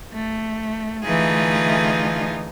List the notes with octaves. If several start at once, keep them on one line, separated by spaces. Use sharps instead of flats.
A3
D3 E3 A3 D#4 F4 G#4